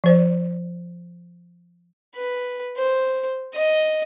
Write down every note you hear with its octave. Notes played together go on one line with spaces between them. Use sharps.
F3 C5 D5
B4
C5
D#5